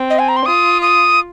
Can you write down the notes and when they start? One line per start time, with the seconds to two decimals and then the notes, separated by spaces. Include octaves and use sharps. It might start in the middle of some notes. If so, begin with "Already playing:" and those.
Already playing: C4
0.10 D#5
0.19 G#5
0.29 A#5
0.36 C6
0.46 F4 D#6
0.82 D#6